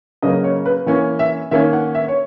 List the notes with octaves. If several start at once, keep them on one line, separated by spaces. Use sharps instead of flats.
C#3 F#3 A#3 D#5
C#5
B4
E3 A#3 C#4 C#5
E5
D#3 A#3 C#4 E5
F#5
E5
C#5